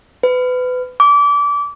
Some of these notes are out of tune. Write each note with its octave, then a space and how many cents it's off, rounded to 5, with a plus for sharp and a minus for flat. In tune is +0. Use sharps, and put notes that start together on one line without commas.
B4 +30
D6 -25